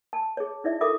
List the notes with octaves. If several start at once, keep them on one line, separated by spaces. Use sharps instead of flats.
A5
G#4 C#5
D#4 E4 D5 E5
F4 A4 A#4 E5 D6 D#6